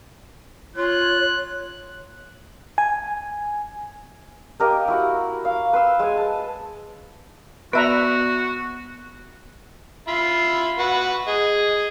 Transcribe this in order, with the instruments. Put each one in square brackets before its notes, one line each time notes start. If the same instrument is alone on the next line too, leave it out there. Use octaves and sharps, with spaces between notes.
[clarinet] F4 [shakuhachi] C#5 [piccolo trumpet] F#6
[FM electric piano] G#5
[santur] A#3 G4 A#4 D#5
E4 F#4 F#5
F5
B4 C6 E6
G#3 G#5
A5
[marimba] B3 D5 [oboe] F#4 [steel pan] B4 E5 A#5
[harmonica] F4 E5 B5
F#4 B4
G#4 D#5